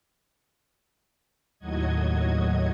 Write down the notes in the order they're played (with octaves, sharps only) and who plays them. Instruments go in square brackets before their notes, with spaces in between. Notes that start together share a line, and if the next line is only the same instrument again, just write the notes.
[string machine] D#2 A2 F#3 F#4 D#5 G#6